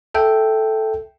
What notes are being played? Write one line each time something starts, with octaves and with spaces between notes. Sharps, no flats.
A4 E5 G5